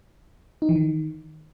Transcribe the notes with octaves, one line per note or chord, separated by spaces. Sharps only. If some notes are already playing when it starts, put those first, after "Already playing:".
D#4
E3
D#3